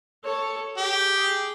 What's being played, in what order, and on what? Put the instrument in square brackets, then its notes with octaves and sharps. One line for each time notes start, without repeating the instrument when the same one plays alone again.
[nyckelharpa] A4 C#5
[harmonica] G4 [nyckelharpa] G#4
[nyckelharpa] G#4